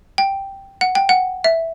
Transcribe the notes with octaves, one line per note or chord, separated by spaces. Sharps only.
G5
F#5
G5
F#5
E5